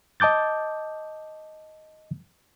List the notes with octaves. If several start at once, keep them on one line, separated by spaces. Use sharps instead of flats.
D#5 A5 D6 G6 A6